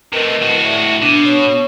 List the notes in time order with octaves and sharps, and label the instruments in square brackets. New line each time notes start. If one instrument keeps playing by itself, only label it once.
[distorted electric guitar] C3 A3 [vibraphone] A#4 B4 D#5
[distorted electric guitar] A2 F#4
[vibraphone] G#4 D5 E5
[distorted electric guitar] B2 [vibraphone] D4
[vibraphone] B3 C#5 C#6